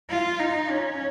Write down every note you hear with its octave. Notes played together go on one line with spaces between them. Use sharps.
F4
D#4
C#4